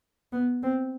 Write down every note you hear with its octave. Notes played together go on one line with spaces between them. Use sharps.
B3
C4